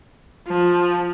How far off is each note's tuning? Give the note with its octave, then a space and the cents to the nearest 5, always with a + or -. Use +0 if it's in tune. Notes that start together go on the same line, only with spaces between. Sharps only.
F3 +15